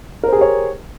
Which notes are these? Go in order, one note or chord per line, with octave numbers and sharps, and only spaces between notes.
G4 G#4 A#4 C5 C#5